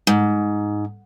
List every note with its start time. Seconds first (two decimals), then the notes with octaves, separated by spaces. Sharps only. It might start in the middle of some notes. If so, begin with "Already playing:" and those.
0.07 G#2